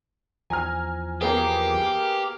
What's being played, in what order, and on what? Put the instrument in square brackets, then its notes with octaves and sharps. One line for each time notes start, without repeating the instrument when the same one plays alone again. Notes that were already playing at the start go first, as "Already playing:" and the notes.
[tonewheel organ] E2 F3 [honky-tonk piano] G#5 A#5 F6
[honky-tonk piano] A#3 B3 G#4 [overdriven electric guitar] G4
[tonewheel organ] F6